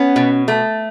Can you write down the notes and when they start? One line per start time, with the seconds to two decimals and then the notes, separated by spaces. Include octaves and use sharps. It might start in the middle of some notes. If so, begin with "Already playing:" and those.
Already playing: B3 C#4
0.16 B2
0.48 A3